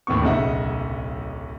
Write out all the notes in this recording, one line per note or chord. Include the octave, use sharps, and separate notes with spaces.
D#2 A2 B3 C#6
D1 B1 C#3 D#4 E5 F#5